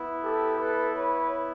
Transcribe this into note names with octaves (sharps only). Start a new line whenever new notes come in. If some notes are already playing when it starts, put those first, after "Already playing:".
Already playing: B3 E4
G4 A4
A4 B4
B4 C#5